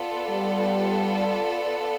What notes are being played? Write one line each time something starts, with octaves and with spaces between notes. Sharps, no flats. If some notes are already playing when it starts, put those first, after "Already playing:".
Already playing: B3 F4 A4 D5
G3